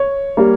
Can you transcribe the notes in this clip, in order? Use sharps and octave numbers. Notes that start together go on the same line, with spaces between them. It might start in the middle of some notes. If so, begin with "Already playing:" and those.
Already playing: C#5
G3 A#3